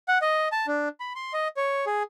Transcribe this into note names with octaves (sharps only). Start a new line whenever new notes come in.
F#5
D#5
A5
D4
B5
C6
D#5
C#5
G#4